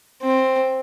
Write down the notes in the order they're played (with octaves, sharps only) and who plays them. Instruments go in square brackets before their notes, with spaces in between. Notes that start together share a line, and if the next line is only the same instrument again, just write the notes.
[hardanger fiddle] C4